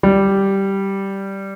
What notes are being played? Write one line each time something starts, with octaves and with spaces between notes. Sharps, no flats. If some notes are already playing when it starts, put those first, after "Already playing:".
G3